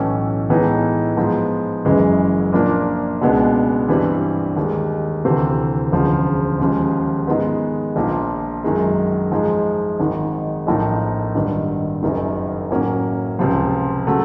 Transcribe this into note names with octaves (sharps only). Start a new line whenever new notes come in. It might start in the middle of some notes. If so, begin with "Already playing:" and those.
Already playing: B1 A2 E3 A3 C#4
A2 E3 G#3 B3 D#4
G#2 F3 G#3 B3
F#1 F#2 C#3 E3 G#3
A#2 F3 A#3 D4
C#2 B2 G#3 B3 D4
G2 E3 G3 C4 E4
D#2 D#3 G#3
D2 C3 E3 A3 C4
E1 D2 C#3 F3
D#2 C#3 F3 G#3
G#2 D#3 G#3 B3
A#1 A#2 F3
F#2 D#3 G#3
G#2 F3 G#3
G#1 G#2 D#3
A#1 A2 F3 A#3 D#4
G#1 G2 D#3
F#1 F#2 D#3
A2 F#3 A#3 C#4
C#2 C3 F3
C#3 F#3 A3